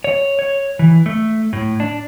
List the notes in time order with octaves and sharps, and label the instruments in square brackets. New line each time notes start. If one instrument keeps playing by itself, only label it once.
[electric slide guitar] C#5
C#5
E3
A3
A2
D4